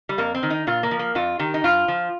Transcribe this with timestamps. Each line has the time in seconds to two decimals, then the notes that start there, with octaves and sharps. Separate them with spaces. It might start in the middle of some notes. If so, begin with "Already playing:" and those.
0.09 G3
0.18 F2 A#3
0.35 C4
0.43 D#3
0.50 D#4
0.67 A#2 F4
0.83 A#3
0.91 F3
0.99 A#3
1.15 F2 F4
1.39 D#3 G4
1.54 D#4
1.64 G2 F4
1.88 F3